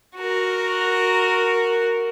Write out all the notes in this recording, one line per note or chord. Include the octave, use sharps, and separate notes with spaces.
F#4 A#4